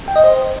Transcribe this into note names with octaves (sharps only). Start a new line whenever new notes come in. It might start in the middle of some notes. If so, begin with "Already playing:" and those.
G5
D#5
C5